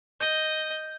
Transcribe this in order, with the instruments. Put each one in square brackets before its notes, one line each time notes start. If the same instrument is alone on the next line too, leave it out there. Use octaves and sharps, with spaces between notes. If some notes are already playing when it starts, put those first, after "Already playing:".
[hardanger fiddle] D#5 [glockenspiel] G6